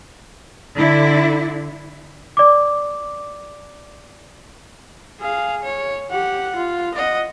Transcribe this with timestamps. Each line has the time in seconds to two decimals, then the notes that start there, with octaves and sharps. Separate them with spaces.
0.77 D3 E4
2.37 D5 D6
5.20 G#4 F5
5.63 C#5
6.11 G4 F#5
6.56 F4
6.95 D#5 F#5